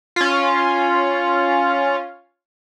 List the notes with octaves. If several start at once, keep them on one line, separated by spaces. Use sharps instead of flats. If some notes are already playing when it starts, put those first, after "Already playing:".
C#4 F4